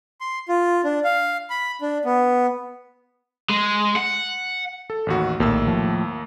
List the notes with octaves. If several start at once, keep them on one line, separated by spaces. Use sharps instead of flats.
C6
F4
D4
F5
B5
D4
B3
G#3
F#5
A4
A1 D#2 F#4
A#1 D#2 A2 A#3 E6
A2 F3